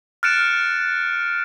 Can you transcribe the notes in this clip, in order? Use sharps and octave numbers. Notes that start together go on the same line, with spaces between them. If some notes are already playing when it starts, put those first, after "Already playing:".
F6 F#6 A6 C#7 D7 E7